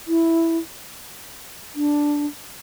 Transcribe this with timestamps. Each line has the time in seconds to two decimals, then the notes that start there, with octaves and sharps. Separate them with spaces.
0.08 E4
1.75 D4